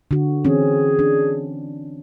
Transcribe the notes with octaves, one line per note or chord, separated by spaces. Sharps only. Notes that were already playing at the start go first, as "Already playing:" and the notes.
D3 F#4
E3 C4 C#4 G#4
D4